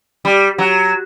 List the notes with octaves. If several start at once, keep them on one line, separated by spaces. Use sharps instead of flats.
G3
F#3